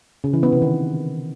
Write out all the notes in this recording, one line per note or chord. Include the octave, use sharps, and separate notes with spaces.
C#3
E3
B3
C3
D#3